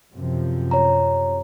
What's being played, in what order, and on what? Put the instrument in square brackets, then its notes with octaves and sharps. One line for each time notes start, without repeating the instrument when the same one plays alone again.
[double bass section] F#2 C3 F3
[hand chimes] C#5 A#5